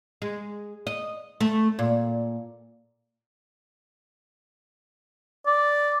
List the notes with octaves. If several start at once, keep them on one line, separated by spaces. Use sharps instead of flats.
G#3
D#5
A3
A#2
D5